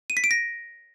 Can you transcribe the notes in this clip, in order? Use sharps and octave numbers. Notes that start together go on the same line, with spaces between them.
D#7
B6
D7
A#6